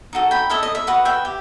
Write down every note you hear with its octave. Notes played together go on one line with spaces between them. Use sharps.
D#4 F#4 A4
G5 B5
E4 A4 D#5 E5
D#5
E5
F#4 B4 D#5
E5 G5
G4